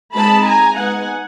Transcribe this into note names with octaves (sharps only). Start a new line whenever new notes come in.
G#3 C4 D#4 A5 B5
G#5 A#5
G#3 B3 D#4 F#5 G#5